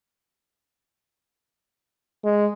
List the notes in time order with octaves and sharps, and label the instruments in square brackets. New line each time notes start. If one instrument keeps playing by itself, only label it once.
[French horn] G#3